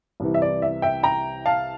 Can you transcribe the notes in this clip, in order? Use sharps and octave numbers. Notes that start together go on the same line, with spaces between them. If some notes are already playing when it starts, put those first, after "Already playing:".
C2 C3 E3
E5
D5
E5
E5 G5
G5 A#5
F5 A5